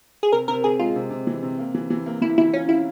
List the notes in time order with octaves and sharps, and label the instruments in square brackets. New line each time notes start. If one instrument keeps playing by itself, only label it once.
[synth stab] G#4
[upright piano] C3 [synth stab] A#4
[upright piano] C3 [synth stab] A#4
[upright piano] C3 [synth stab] G#4
[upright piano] G#3 [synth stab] F4
[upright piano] C3
C3
E3
C3
A#3
E3
E3
A#3
[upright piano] E3 [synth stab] E4
[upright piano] E3 [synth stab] E4
[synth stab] C#4 [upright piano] F4
[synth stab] E4 [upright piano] F4